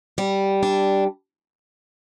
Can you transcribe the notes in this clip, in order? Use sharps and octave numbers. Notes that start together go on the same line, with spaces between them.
G3
D4